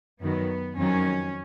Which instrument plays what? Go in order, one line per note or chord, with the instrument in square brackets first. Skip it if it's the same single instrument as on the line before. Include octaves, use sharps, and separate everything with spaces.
[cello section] F#2 D#3 F#3 B3
F2 D#3 F#3 C#4